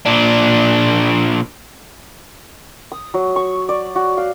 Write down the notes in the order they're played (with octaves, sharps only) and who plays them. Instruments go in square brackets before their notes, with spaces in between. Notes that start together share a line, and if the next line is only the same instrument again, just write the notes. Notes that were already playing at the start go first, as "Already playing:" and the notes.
[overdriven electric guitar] A#2 D4
[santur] D#6
F#3
C#6
D5
F#4
F5